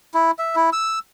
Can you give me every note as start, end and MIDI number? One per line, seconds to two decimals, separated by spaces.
0.14 0.31 64
0.39 0.56 76
0.56 0.70 64
0.73 0.99 88